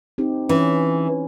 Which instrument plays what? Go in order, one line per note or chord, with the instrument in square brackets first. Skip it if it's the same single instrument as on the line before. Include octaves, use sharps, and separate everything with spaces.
[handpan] C4 D#4 G4
[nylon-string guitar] E3 [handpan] C#4 B4